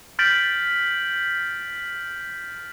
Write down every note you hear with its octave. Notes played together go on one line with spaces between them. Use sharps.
F6 G6 A6 B6 D7 F#7